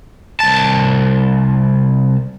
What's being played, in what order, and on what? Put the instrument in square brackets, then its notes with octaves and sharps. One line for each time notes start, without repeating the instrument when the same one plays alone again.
[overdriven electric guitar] C2 A5